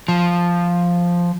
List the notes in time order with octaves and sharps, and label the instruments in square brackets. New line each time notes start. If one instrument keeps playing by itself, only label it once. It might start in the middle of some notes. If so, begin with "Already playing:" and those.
[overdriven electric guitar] F3